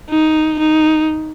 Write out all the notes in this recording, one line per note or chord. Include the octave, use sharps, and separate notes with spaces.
D#4
D#4